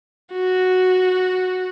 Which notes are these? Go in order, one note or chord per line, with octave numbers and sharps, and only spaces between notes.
F#4